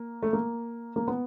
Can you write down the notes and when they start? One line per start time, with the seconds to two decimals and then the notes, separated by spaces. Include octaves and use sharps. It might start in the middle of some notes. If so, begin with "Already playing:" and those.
Already playing: A#3
0.22 A3
0.33 A#3
0.96 A#3
1.08 B3